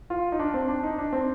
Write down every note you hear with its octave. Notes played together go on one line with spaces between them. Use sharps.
F4
D#4
D4
C4
D4
D#4
D4
C4